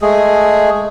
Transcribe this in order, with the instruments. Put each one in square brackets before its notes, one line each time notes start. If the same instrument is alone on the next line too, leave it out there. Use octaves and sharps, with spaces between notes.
[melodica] G#3 A3 G#4